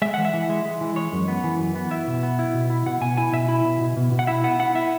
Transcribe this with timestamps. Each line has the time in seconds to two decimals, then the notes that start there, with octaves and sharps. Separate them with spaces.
0.02 G#3 E5
0.14 E3 F#5
0.25 E5
0.33 E3
0.49 G#3
0.66 G#3
0.81 E3
0.96 G#3 C#5
1.12 F#2
1.28 B3
1.44 E3
1.59 F#2
1.75 B3
1.91 E4 E5
2.08 B2
2.23 B3
2.39 E4
2.54 B2
2.70 E4
2.86 B2 F#5
3.01 B2 G#5
3.17 E4 G#5
3.33 B2 E5
3.48 E4
3.65 B2
3.81 B2
3.97 B2
4.12 B2
4.19 F#5
4.27 E4 E5
4.44 B3 F#5
4.59 E4 F#5
4.75 E4 E5